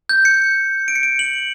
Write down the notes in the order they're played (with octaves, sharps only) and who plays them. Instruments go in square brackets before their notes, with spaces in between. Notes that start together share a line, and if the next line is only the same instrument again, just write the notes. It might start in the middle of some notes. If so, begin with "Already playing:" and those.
[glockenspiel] G6
C#7
D7
C#7
D7
F#7